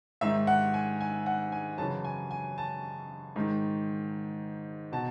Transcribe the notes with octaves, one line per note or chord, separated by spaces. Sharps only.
G#2 D#3 E5
F#5
G#5
G#5
F#5
G#5
F#2 C#3 E3 A5
G#5
G#5
A5
G#2 D#3
B2 A5